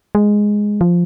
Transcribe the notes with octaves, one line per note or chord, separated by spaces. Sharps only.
G#3
F3